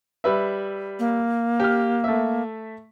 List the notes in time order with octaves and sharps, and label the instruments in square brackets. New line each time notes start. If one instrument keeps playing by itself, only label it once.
[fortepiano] G3 B4 E5
[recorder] A#3
[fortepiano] G4 F6
A3 E5